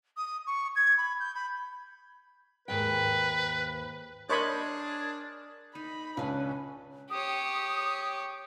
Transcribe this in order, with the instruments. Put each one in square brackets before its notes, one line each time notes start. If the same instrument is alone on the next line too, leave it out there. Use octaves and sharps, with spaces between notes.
[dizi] D#6
C#6
G#6
B5
G6
B5
[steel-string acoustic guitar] D#2 G#2 G5 [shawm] B4
[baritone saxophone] D4 [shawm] G#4 [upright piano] A#4 C6 G6 [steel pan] C#5 D#5 B5
[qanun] D#4 [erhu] B5
[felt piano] C#2 [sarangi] C#4 [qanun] D4 B4
[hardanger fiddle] G4 C#5 [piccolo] D#6